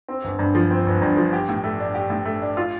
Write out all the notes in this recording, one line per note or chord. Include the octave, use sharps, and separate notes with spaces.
C4
G1
G2
F3
C4
G1
G2
F3
G4
A2
A3
D4
G4
A2
A3
D4
F4